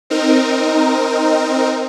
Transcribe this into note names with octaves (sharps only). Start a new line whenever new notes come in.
C4 D#4 A#4